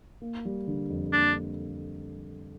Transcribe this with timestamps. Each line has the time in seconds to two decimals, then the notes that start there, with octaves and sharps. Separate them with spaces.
0.22 A#3
0.45 G3
0.67 D3
0.90 F2
1.13 A#3 D4